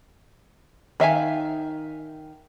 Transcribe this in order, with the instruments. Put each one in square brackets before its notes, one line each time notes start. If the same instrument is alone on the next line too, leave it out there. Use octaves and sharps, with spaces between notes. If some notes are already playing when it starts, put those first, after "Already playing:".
[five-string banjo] D#3 E5 F5 G#5